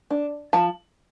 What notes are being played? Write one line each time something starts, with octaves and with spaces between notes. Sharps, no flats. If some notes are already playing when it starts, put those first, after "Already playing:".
D4
F3 A5